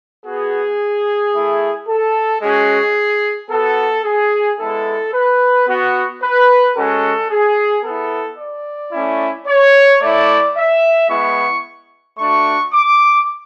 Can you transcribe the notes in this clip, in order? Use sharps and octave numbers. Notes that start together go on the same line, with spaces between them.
B3 F#4 G#4
A3 E4
A4
G#3 C#4 F#4 G#4
B3 F#4 A4
G#4
G#3 B3 E4 A4
B4
B3 F#4
B4
G#3 C#4 F#4 A4
G#4
B3 E4 A4
D5
A3 C#4 E4
C#5
A3 E4 D5
E5
G#3 B3 E4 C#6
A3 D4 F#4 C#6
D6